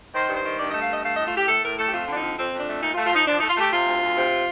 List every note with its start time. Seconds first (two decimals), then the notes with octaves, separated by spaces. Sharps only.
0.14 D#3 C5
0.29 G2
0.37 C5
0.44 D#3
0.59 G2 D5
0.70 A3 D#5
0.81 F5
0.89 G2 D#5
1.03 A3 F5
1.15 A2 D#5
1.26 F4
1.33 A2 G4
1.48 A3 A4
1.64 A2 A#4
1.78 A3 A4
1.87 G4
1.93 F2 F4
2.08 D3 D4
2.15 D#4
2.22 F2
2.37 F2 C4
2.53 F2
2.60 D4
2.68 A3
2.82 A#2 D#4
2.93 F4
2.98 A3
3.05 F4
3.13 F3 D#4
3.27 F3 D4
3.38 A3 D#4
3.50 F4
3.57 A3 G4
3.72 C3 F4
3.87 D2
4.02 D2
4.16 C3